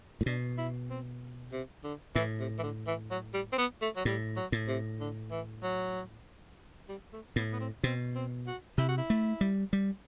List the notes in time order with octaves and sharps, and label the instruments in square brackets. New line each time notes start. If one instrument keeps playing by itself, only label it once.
[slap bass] A2
[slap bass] B2 [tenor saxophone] D4
[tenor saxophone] E4
C4
C3
D3
[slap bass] A2 [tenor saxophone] E3
[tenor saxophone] C3
E3
D3
E3
F#3
G3
C4
B3
A3
F#3
[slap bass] A2 [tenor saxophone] G3
[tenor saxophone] F#3
[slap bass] A2
[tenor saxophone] C3
D3
E3
F#3
G3
A3
[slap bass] A2 [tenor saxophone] B3
[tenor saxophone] B3
C4
[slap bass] B2 [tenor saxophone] C4
[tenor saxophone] C4
F#4
[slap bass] C3 [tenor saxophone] E4
[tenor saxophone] F#4
E4
[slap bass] A3
G3
G3